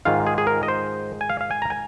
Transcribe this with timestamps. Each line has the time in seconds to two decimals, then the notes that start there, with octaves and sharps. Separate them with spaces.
0.05 G#2 D#3 G#3 F4 F5
0.27 G#4
0.38 G#4
0.47 A#4
0.63 D#5
0.68 C5
1.21 G#5
1.30 F5
1.41 F5
1.51 G#5
1.62 A#5
1.70 G#5